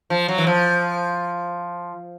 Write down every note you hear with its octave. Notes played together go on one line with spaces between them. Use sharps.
F3
F#3
E3
F3